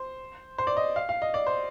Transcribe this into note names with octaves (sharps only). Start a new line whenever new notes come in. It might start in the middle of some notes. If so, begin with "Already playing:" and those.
Already playing: C5
C5
D5
D#5
F5
F5
D#5
D5
C5